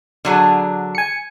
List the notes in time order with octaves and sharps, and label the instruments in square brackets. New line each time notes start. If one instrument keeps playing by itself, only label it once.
[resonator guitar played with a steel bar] D3 F#3 G#4
[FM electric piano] G#5 C#7